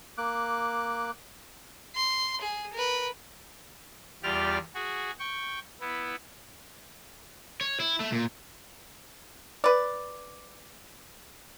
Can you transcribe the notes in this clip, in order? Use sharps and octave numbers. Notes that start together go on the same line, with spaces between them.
A#3 D6 F#6
C6
G#4
A#4 B4
E2 G3 F4 G4 D5 F6
F#4 G#4
G5 C#6
B3 E4
C#5
E4
A3
A#2
B4 D5